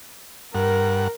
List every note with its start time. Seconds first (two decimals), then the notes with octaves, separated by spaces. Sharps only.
0.55 G2 A#4 F#5